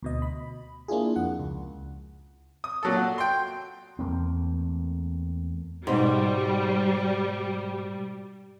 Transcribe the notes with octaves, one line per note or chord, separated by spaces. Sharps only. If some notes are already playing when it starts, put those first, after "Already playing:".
D2 B2 D#5
B5
A#3 D4 E4 F4 G#4
F2 F#5
C#2
D#6
A#2 F#3 A4
F#4
G5 C6
E2 A3 A#3 C4
G#2 B2 G3